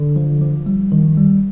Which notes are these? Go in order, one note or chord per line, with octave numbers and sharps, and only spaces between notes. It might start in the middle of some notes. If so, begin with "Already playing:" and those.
Already playing: D3
F3
F3
G3
D#3
G3